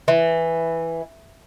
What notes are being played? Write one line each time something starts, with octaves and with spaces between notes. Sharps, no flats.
E3